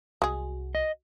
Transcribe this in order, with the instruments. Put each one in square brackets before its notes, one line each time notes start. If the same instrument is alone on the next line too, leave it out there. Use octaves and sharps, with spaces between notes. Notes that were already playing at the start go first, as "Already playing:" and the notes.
[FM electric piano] C2 F#4 [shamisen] G#3 G#4
[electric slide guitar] D#5